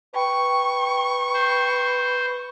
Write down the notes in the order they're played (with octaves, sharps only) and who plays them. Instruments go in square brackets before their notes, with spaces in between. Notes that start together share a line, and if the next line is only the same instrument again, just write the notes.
[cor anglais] B4 [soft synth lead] G5 [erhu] C#6
[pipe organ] C5